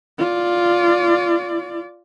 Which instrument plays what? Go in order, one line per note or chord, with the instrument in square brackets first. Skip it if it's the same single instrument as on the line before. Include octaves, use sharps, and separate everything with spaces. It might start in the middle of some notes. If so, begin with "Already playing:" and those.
[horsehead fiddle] F4 D5